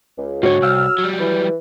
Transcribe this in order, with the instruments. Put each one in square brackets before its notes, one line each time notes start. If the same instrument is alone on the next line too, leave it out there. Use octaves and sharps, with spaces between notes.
[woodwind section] C#2
[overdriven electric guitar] G#2 D3 [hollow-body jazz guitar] F#4 C#5
[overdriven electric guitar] C2 [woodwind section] E6 F6
[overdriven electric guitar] F#3 G3
[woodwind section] E3